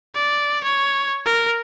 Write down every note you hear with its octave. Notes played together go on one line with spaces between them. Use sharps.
D5
C#5
A#4